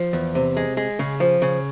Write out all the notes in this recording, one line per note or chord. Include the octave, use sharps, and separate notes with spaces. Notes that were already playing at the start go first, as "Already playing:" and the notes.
Already playing: F3
E2
C3
G#3
G#3
C#3
F3
C#3